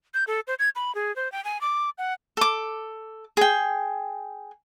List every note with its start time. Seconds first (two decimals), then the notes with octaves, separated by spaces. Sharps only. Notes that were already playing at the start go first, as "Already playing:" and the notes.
0.14 G6
0.27 A4
0.47 C5
0.59 G#6
0.76 B5
0.95 G#4
1.16 C5
1.32 G5
1.44 G#5
1.61 D6
1.98 F#5
2.37 A4 D6
3.37 G#4 G5